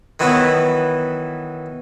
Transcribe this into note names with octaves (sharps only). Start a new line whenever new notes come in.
D#3 E3 F#3 B3 E4